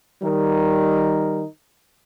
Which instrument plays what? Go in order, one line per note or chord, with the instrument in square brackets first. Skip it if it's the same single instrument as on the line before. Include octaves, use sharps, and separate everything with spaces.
[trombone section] D#3 G3 D#4 A#4